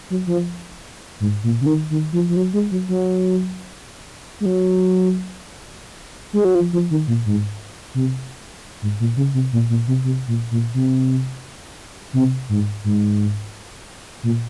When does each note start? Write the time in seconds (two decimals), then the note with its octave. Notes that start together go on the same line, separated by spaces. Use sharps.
0.10 F#3
0.27 F3
1.20 G#2
1.43 A#2
1.61 C#3
1.66 D#3
1.90 D#3
2.13 F3
2.29 F3
2.36 F#3
2.53 G#3
2.71 F#3
2.89 F#3
4.40 G#3
4.46 F#3
6.33 G#3
6.45 F#3
6.55 F3
6.73 F3
6.91 D#3
7.08 A#2
7.26 G#2
7.94 C3
8.82 G#2
9.00 A#2
9.17 C#3
9.34 C3
9.53 A#2
9.69 A#2
9.87 C3
10.04 C3
10.27 A#2
10.51 A#2
10.74 C3
12.13 C3
12.49 G#2
12.84 G#2
14.23 A#2